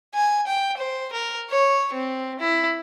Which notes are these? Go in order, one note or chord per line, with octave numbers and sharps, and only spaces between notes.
G#5
G5
C5
A#4
C#5
C4
E4